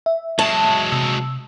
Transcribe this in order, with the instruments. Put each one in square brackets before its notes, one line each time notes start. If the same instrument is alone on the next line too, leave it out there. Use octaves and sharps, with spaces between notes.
[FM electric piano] E5
[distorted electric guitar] F#3 G#3 [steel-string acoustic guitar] A5
[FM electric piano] C3 E6